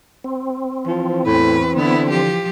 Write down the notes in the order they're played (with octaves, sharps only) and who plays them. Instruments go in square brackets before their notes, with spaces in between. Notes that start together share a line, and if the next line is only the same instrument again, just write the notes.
[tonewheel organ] C4
[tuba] E3 [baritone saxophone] F3
[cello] E2 B4 [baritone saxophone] A2
[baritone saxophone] D3 [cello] B3 E4
[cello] F3 G4